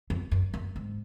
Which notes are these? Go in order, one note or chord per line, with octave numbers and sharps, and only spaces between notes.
F2
F#2
F#2
G#2